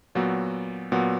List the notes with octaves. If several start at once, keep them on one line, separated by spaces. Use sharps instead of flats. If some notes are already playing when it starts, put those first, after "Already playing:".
A#2 F#3 B3 F#4
A#2 F#3 B3 F#4